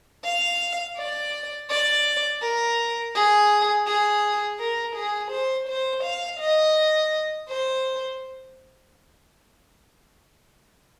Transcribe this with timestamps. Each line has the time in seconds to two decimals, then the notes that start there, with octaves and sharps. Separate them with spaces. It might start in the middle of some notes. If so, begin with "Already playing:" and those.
0.24 F5
0.97 D5
1.70 D5
2.42 A#4
3.15 G#4
3.86 G#4
4.59 A#4
4.96 G#4
5.31 C5
5.68 C5
6.03 F5
6.40 D#5
7.49 C5